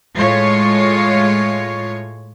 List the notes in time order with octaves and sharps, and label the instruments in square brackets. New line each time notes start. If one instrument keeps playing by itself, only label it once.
[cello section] A2 G#3 F4 C#5